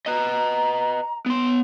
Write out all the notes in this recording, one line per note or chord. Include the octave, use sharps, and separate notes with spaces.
B4 D#5 A#5
B3 C6